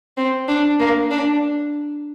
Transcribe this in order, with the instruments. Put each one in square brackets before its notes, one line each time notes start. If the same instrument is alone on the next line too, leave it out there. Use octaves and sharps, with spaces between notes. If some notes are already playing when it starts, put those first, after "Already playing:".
[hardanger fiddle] C4
D4
A#3
D4